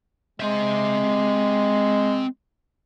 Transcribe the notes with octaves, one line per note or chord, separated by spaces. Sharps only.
G#3 C4 E5